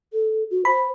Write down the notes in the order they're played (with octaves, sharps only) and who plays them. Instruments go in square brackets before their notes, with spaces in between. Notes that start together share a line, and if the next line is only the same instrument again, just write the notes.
[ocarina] A4
F#4
[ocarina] C5 [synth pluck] B5